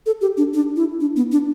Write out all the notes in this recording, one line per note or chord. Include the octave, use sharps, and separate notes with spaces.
A4
G4
D4
D4
E4
D4
B3
D4